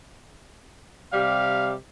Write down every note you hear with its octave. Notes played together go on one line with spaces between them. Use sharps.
C3 G3 G4 F5